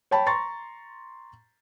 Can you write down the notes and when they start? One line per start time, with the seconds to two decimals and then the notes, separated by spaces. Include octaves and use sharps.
0.11 C#5 G5 A5 B5
0.26 A#5 C6 C#6 A6